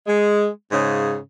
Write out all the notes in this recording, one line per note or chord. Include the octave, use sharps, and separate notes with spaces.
G#3
G#2 C#3